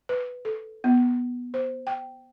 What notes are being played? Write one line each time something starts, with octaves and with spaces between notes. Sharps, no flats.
B4
A4
B3
C5
G5